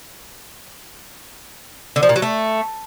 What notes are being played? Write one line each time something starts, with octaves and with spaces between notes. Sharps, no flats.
D3
F3
A#2
F#3
A3